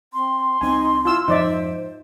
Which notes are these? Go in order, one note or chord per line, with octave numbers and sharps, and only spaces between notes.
C4 C6
C2 C4 D#4 G#5
E4 F4 E6
F2 G#2 F3 D#4 C5 D5 E5